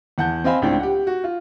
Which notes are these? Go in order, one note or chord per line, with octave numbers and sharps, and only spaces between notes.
E2 F#5 A5 G6
C4 C5 D#5 F5 G#5 B5
C#2 A2 C4 D4
G4 F#5
F#4
F4